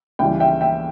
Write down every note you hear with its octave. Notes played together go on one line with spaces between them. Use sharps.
C#2 C#3 E3 G3 E5 G5
E5 G5
E5 G5